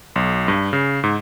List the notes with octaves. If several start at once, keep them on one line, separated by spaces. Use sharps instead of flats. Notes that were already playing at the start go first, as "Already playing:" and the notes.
B1
G2
C#3
G#2